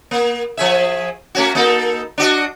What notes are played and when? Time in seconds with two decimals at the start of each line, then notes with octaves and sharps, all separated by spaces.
0.11 A#3
0.57 F3 G#4 E5
1.35 A3 C#4 F#4
1.55 A#3 D#4 A4
2.18 D4 F#4 D#5